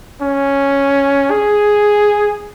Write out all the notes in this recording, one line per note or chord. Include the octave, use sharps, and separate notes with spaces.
C#4
G#4